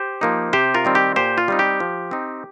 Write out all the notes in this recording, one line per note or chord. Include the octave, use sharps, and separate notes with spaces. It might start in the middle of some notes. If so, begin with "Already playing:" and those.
Already playing: G4 C5
F3 A#3 D#4
C3 G4 C5
F4 A#4
D#3 G3 C4
G4
A#2 G4 C5
F4
G3 C4 D#4
G4
F3
C4 D#4